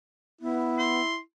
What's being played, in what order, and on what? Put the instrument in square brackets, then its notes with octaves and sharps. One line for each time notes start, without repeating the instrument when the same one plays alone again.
[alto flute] B3 [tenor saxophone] E4
[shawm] C6